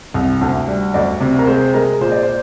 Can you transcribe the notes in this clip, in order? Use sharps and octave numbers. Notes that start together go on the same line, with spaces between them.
C2
D2
G3
D2 D5
C3
A#4
G#3 C5
G#3 A#4
A#2 C5
D5
C5